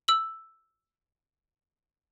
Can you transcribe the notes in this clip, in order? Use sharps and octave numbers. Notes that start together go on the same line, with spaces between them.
E6 F#7